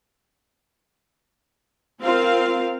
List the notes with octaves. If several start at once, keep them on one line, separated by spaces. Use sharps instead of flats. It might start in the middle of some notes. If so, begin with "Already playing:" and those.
C4 F4 A#4 F5